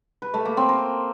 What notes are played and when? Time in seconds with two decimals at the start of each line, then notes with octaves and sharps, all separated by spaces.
0.22 B4
0.34 A3
0.45 A#3
0.57 C4
0.69 A#4